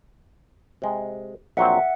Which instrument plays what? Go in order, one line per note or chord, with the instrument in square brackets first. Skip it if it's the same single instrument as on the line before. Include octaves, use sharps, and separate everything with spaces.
[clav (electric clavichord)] C3 G#3
[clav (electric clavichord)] A#1 F#3 C4 [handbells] E5 F#5